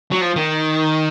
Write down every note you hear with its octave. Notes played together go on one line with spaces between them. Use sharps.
F#3
F3
D#3